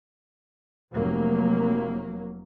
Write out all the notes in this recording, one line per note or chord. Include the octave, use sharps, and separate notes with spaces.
F1 F#3 A#3